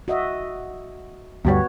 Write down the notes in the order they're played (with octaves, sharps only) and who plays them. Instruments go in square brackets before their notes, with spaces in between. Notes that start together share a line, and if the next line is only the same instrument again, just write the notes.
[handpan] F#4 D#5 E5
[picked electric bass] D2 G2 G3 [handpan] B3 F#4 C#5